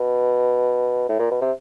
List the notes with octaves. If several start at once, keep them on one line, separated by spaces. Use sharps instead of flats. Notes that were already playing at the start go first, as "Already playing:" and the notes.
Already playing: B2
A2
A#2
B2
C3